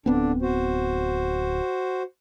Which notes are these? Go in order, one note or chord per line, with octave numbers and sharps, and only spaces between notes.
D1 D3 B3 C4 D4
F#4 C5